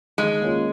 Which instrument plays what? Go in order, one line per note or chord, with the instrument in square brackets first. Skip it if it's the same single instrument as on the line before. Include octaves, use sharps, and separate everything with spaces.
[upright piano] D#3 [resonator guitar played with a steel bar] G#3
[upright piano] A#3 C#4 F4